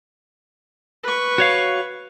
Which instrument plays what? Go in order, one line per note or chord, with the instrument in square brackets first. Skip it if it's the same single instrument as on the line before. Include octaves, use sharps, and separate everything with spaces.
[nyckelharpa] B4 C#6
[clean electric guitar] F#4 C#5 F5